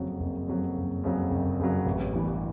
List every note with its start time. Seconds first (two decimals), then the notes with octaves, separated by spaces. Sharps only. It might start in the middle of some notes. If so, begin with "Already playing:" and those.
Already playing: F#1 F2 C#3 F#3
0.20 F#1
0.48 F2 C#3 F#3
0.76 F#1
1.04 F2 C#3 F#3
1.30 F#1
1.59 F2 C#3 F#3
1.86 A1
2.14 G2 E3 G3 B3